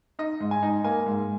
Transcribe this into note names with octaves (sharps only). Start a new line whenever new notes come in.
D#4 D#5
G#2
G#5
D#4
A#3 G#5
G#2